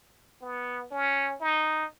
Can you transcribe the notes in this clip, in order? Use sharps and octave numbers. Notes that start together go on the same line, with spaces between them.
B3
C#4
D#4